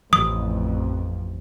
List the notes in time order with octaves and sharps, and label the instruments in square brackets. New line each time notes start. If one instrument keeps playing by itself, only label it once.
[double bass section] A1 F2 [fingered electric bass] F3 [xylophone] D#6